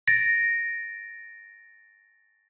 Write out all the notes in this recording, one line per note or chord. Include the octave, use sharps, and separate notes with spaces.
A6 A#6 D7